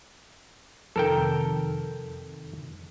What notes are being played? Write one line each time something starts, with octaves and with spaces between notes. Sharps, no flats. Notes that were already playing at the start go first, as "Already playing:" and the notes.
F2 C3 D#3 A4 A#4 G5